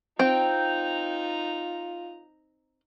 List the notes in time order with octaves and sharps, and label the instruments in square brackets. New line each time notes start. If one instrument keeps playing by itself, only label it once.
[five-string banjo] C4 [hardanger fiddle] D#4 A#5 [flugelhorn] F4 [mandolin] G5